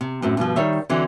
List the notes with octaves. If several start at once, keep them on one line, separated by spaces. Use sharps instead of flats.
C3
F#2 A2 C4
G2 B2 D3 F3
D#3 G3 C#5 E5
D3 E3 F#3 C4